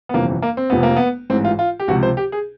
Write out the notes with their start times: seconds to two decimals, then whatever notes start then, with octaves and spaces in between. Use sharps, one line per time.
0.09 B3
0.14 G1 F2 C3 E3 A#3
0.42 A#3
0.57 C4
0.70 F1 F2 C3 F3 B3
0.83 A#3
0.96 B3
1.30 A1 G#2 E3 C4
1.45 F4
1.59 F4
1.80 G4
1.88 C#2 C3 F3 F#4
2.03 C5
2.17 G4
2.32 G#4